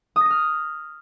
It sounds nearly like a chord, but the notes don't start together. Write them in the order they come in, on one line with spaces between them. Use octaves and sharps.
D#6 A#6 D#7 F6